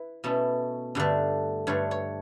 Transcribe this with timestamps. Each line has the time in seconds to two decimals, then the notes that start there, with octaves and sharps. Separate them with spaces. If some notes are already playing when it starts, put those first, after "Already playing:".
Already playing: E4 B4
0.24 B2 A3 C#4 E4
0.95 G2 D3 A3
1.67 G2 D3 A3 C#5
1.91 C#5